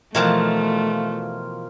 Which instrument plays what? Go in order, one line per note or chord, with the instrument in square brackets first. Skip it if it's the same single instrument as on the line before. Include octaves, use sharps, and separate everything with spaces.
[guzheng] B2 E3 F3 [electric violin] A3 [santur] F4 A#4 G5